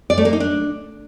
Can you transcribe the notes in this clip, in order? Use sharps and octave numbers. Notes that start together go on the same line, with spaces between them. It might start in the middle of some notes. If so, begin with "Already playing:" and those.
D5
A3
A#3
D#4
D4